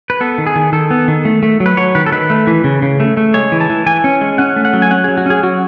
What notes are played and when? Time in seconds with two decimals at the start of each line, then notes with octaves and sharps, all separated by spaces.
0.10 B4
0.20 B3 A4
0.38 D#3
0.47 G#4
0.56 D#3
0.73 D#3 A4
0.91 B3
1.08 D#3
1.25 A3
1.43 A3
1.60 F#3
1.66 B4
1.77 F#3 C#5
1.95 D#3 B4
2.06 A4
2.12 D#3 B4
2.30 A3
2.47 E3
2.64 C#3
2.82 C#3
3.00 A3
3.17 A3
3.34 G#3 C#5
3.52 E3
3.61 A5
3.70 E3
3.86 E3 G#5
4.04 C#4
4.21 G#3
4.38 C#4 F#5
4.56 A3
4.65 F#5
4.73 F#3
4.82 G#5
4.91 C#4 F#5
5.04 F#3 G#4
5.17 F#4
5.26 C#4 G#4
5.43 F#3 F#4